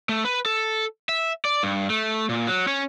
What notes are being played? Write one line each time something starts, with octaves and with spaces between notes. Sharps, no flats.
A3
B4
A4
E5
D5
G2
A3
A#2
F#3
C#4